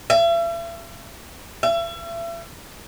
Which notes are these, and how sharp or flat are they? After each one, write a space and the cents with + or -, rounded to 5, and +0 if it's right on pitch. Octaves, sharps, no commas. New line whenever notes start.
E5 +40
E5 +40